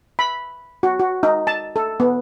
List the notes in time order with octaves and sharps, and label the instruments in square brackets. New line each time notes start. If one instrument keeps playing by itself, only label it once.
[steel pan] B5
F#4
F#4
D#4
A5
A4
B3